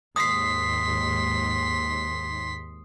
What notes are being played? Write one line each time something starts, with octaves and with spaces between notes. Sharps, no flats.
D#2 G#2 C6 D#6 B6 C7